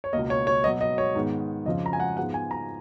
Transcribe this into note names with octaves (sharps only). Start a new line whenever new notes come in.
C#5
C#2 B2 A#3 D#5
C#5
C#5
B2 F#3 B3 D#5
D#5
C#5
G#2 D#3 G#3 B3
F2 C#3 F3 D#5
A#5
G#5
F#5
G#2 F3 G#3 B3 F#5
G#5
A#5